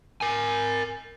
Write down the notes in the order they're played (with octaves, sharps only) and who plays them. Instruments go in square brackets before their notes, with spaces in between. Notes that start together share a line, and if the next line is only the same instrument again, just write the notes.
[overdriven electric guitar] A#4 G#5